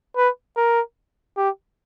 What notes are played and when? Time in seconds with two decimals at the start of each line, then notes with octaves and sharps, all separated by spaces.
0.17 B4
0.57 A#4
1.37 G4